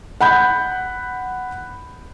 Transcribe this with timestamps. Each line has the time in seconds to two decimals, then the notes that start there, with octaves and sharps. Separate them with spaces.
0.21 F#5 B5 G6